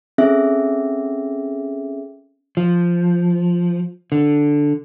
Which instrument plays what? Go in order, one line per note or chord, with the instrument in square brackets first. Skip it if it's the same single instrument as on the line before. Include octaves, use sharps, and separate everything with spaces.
[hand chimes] C4 C#4 G#4 A4 E5
[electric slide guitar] F3
D3